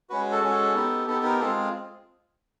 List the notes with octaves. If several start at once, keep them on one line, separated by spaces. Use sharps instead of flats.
G#3 C#4 F#4 B4
A4
G#3 C#4 F#4
B3 D#4 G4
B3 D#4 G4 A4
A#4
G#3 C4 F4 G#4 A4